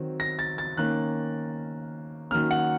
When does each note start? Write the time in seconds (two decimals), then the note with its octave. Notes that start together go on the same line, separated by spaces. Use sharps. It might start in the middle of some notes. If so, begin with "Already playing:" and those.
Already playing: D#3 F#3 C4
0.20 A#6
0.39 A6
0.58 A6
0.77 D#3 A#3 C#4 F#6
2.31 D#3 F#3 A#3 C#4 F6
2.51 F#5